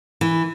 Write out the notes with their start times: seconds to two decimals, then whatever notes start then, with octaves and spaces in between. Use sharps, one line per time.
0.21 E3